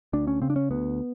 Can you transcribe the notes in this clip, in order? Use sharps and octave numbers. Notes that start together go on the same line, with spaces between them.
D2 D4
C#4
C#3 C4
D4
C#4
D2 B3